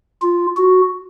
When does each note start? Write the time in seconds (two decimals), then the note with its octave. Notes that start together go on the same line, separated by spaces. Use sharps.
0.22 F4
0.57 F#4